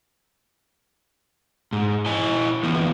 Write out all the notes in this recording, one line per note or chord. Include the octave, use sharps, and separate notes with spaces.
G#2
E4 D#5 G#5
D3 E3 F3 B3